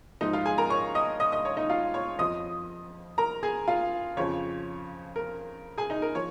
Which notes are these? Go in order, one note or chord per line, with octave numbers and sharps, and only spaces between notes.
G#2 F3 D#4 D#5
F4 F5
G#4 G#5
A#4 A#5
C#5 C#6
D#5 D#6
D#5 D#6
D#5 D#6
C#5
D#4 D#5
F4 F5
C#5 C#6
F2 F3 D#5 D#6
A#4 A#5
G#4 G#5
F4 F5
F2 C#3 F3 C#5
A#4
G#4 G#5
D#4 D#5
A#4
F3 C#5